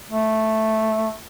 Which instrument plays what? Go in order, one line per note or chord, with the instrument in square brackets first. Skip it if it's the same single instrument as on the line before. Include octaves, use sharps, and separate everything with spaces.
[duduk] A3